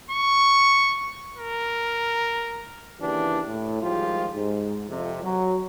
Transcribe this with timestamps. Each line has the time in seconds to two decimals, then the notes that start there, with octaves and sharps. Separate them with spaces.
0.10 C#6
1.37 A#4
3.00 D#2 C#3 E3 A#3 D4 G4
3.47 A2
3.83 G#1 F3 G3 G#3 F4 G4
4.34 G#2
4.88 F2 C3
5.23 F#3